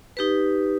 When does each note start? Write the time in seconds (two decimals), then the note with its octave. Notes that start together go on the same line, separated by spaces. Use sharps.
0.17 D#4 G4 B4